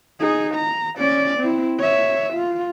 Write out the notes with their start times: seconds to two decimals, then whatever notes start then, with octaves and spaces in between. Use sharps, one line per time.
0.20 D#4 G#4
0.55 A#5
0.97 C#4 D5
1.39 C4 E4
1.79 C#5 E5
2.34 F4